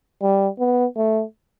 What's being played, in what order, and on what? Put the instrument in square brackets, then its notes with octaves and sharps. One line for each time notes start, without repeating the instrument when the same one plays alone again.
[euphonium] G3
B3
A3